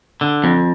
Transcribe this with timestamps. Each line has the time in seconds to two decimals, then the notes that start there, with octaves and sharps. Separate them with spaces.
0.21 D3
0.44 F2